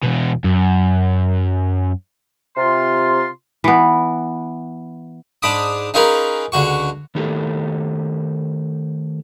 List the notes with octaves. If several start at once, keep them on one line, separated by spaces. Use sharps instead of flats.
E2 B2
F#2
C3 F4 C6
E3 B3
G#2 D4 B5 D6 D#6
C#4 D#4 F4 G#4 A#4 B4
C#2 D3 F#4 C#6
D#3 A3 D#4 G4 A4